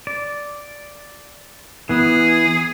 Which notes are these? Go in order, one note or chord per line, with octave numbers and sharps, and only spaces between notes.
D5
E3 B3 G#4